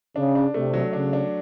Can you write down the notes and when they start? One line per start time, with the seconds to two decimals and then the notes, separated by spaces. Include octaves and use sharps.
0.16 C#3 D4
0.35 D4
0.54 C3 A3
0.74 F#3
0.93 C#3 D4
1.13 D4